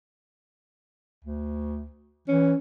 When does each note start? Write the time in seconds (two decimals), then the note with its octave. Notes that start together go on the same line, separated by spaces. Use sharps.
1.24 D2
2.28 E3 C#4